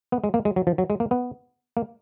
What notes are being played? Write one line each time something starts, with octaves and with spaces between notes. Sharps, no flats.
B3
G#3
A#3
G#3
F#3
F3
F#3
G#3
A#3
B3
A#3